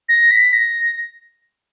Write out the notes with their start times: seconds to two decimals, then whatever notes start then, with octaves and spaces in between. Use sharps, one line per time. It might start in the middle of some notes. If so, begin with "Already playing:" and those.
0.09 A#6
0.31 B6
0.53 A#6